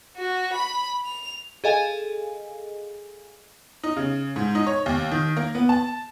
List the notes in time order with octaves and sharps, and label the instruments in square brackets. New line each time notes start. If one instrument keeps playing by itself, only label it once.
[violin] F#4
B5
F7
[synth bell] G#4 A4 D#5 F5 G#5
[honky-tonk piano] D#4
C#3
G#2
D#4
C#5
D#2
D#3
A#3
B3
A5